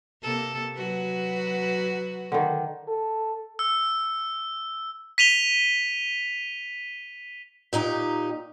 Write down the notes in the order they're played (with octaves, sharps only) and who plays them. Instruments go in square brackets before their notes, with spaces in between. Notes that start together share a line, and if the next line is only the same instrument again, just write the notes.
[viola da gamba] C3 A#3 A4
F#3 F#4 B4
[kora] D3 D#3
[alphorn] A4
[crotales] E6
B6 D#7 F7 G7
[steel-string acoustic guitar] A#2 D#4 G4